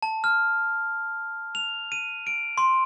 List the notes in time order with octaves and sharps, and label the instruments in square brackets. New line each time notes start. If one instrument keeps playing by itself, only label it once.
[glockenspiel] A5
F6
F7
D#7
D7
C6